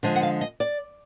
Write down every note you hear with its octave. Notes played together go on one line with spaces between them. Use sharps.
D3 F3 G#3
F#5
F5
D#5
D5